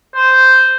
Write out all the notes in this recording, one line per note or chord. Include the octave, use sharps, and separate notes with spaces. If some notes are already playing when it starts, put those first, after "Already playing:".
C5